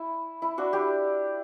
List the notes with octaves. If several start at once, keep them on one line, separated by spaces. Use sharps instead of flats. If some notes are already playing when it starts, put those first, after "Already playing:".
Already playing: E4
E4
D4 F#4
E4 G4